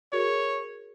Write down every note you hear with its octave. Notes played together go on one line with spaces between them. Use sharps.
F#4 G#4 A#4 C#5